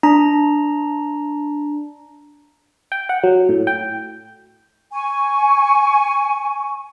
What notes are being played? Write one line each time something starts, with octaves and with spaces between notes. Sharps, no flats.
D4 A#5
G5
F#5
F#3
A2
G5
G#5 C#6